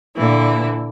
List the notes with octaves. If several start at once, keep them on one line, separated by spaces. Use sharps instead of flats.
A#2 D3 E3 E4